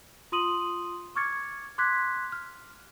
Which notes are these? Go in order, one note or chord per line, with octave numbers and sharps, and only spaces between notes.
F4 C6 D#6 D#7 F#7
C#6 D6 F6 G#6 A6 C#7
C6 D6 F#6 G#6 B6
F6